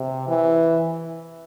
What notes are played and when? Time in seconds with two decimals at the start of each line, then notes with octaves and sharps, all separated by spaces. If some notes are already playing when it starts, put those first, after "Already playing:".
Already playing: C3
0.28 E3